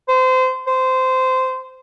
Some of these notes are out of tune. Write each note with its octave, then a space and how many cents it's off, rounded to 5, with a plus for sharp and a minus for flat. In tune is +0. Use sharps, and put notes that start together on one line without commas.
C5 -25
C5 -15